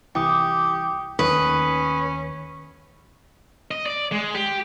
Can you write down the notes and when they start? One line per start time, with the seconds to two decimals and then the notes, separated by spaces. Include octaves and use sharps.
0.15 C2 E3 G4 G5 D6 D#6
1.19 D#2 D#3 A3 C#4 B4 D#6
3.71 D#5
3.86 D5
4.12 G#3
4.35 G4